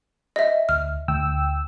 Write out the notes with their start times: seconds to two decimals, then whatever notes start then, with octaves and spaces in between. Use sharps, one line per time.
0.36 D#5 E5
0.69 D2 F6
1.08 D2 G5 E6